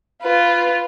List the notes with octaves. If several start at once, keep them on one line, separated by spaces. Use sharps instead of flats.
F4 B4